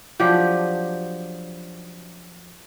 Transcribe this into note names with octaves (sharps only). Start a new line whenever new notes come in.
F3 F#3 D4 G4